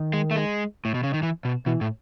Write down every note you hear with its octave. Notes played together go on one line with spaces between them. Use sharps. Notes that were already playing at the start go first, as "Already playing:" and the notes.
Already playing: D#3
G#3
A3
G#3
A2
B2
C#3
D#3
E3
B2
B2 E3
A2